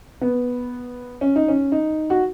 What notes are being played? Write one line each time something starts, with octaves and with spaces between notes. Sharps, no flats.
B3
C#4
D#4
C#4
D#4
F#4